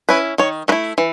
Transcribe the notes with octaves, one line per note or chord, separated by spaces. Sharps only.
C#4 E4 B4
D#3 C#5
A3 E4 B4
E3